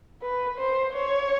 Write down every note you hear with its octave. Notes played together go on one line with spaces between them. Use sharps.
B4
C5
C#5